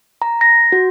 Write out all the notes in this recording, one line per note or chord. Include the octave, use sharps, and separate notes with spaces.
A#5
A#6
F#4